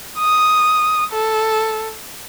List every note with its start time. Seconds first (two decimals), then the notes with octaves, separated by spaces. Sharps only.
0.18 D#6
1.13 A4